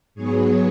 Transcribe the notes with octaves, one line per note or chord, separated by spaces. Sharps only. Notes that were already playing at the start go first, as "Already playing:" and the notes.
G#2 F#3 B3 G#4 C#5